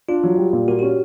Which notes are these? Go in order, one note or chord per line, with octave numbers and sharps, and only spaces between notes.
D4 F4
F#3
G3
A#2
A#3 F#4
C#4 G4